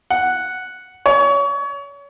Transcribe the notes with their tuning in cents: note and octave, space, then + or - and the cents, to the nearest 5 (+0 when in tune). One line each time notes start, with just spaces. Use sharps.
F#5 +0
C#5 +30